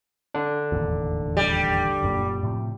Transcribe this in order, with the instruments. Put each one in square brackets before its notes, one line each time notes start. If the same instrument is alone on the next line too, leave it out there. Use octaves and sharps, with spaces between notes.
[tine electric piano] D3 D4
[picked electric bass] E1 A1 D#2
[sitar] G3
[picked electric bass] F1 F#2 A#2
A2 C3 F3